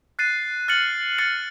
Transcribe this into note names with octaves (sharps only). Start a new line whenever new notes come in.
F#6 A6 C7 D#7
F6 A6 C#7 F#7
F6 A6 C#7 F#7